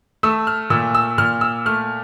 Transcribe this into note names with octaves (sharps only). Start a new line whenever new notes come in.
A3 E6
F6
A#2 E6
E6
A#2 F6
E6
A3 F6